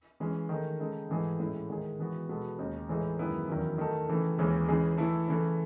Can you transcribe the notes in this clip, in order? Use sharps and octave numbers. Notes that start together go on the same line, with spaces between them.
E3 G#3 C#4
D#3 A3 D#4 G#4
C#3 G#3 D#4 A4
G#2 E3 A3 D#4 G#4
A2 G#3 C#4 E4
D#3 G#3 D#4 G#4
E3 G#3 B3 F#4
B2 G#3 B3 F#4 A4
D#2 C#3 G#3 D#4
A2 E3 G#3 D#4 G#4
F#2 D#3 G#3 B3 E4
E2 D#3 F#3 C#4 E4
D#3 A3 D#4 A4
C#3 E3 A3
D#2 C#3 E3 G#3 C#4
C#3 E3 G#3 D#4 G#4
E3 A3 E4 A4
C#3 E3 A3